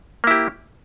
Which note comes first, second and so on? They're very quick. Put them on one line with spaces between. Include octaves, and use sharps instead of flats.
A#3 E4 G4